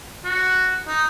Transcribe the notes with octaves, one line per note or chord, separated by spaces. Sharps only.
F#4
D#4